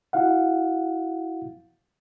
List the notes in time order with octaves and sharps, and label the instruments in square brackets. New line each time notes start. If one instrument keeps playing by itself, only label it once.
[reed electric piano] E4 F#4 F5 F#5